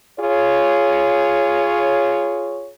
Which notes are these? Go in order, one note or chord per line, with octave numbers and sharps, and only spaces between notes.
F4 G#4 C#5